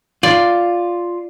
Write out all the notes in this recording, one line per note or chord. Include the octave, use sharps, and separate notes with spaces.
F4 D5